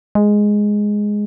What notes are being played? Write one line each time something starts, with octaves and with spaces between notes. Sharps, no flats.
G#3